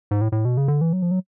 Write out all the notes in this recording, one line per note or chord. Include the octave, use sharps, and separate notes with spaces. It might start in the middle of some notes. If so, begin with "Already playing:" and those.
G#2
A2
A2
B2
C#3
D3
E3
F#3
F3
F#3